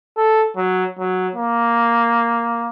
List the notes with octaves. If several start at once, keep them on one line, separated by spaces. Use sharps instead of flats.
A4
F#3
F#3
A#3